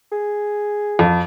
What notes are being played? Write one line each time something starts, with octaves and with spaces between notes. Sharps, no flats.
G#4
F2